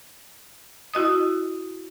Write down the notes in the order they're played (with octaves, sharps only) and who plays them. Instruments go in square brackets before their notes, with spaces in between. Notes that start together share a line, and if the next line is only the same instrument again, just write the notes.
[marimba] E4 F#4 D#5 D#6